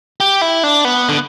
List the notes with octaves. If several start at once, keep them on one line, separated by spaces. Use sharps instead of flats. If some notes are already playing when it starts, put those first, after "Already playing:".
G4
E4
D4
B3
D3